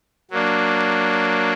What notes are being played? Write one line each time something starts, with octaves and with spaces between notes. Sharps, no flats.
F#3 A#3 D4